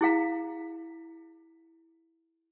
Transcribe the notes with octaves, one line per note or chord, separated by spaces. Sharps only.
E4 G#4 F5 A#5